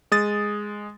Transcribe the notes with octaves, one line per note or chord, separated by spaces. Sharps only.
G#3 D#6 A6